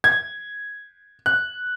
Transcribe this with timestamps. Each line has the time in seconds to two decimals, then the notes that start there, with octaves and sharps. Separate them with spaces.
0.04 G#6
1.26 F#6